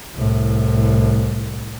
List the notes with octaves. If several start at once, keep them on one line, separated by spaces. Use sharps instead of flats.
C2 A2